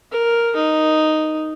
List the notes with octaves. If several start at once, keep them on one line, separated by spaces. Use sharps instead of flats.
A#4
D#4